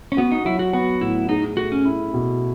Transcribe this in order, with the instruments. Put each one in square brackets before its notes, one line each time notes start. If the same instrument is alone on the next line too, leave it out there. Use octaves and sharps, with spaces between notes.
[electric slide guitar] C#4
[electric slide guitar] B3 [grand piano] F#4
[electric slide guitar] D#4
[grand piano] F#3 [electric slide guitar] E4
[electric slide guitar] F#4
[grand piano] B3 [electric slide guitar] F#4
[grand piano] A2 [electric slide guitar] E4
[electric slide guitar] D#4 [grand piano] G#4
[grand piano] A3 [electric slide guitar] F#4
[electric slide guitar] C#4
[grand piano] E4
B2